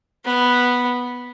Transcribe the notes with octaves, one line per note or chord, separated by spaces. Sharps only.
B3